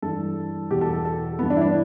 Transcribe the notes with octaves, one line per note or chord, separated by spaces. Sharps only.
G2 E3 A4
E2 B2 G4
A4
A4
A4
G2 E3 B3
D4
E4
D4